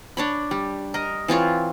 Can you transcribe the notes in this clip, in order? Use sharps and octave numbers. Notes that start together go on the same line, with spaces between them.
D4 C#5 B5
G3
A#4 D#5
E3 C4 F4 C#5